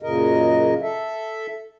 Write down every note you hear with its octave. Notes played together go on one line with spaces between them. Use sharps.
F#2 A#2 C#3 A#4 D#5
A4 E5